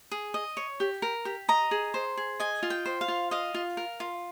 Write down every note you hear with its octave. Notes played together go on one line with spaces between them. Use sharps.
G#4
D#5
C#5
G4
A#4
G4
D#5 A#5
G#4
C5
G#4
D#5 G#5
F4
G5
C5
F5
F4
D#5 F5
F4
A#4
F4